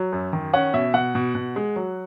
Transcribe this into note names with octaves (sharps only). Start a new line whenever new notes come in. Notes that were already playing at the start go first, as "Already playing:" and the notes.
Already playing: F#3
F#2
D#3
C#4 F#5
B2 E5
B2 F#5
B2
B2
G#3
F#3